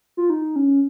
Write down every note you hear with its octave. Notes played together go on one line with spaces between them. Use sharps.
F4
D#4
C#4